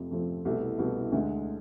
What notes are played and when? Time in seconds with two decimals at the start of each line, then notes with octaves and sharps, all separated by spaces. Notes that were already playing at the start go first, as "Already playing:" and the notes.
Already playing: F2 C3 F3 A3 C4
0.11 F2 C3 F3 A3 C4
0.45 C2 B2 A3 E4
0.78 C2 B2 A3 E4
1.12 D2 D3 G#3